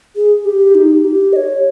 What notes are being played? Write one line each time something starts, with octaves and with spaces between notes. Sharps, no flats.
G#4
G4
D#4
G4
D#5
C#5